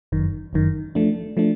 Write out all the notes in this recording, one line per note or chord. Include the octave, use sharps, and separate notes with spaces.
G1 F#2 D#3
G1 F#2 D#3
F3 A3 D4
F3 A3 D4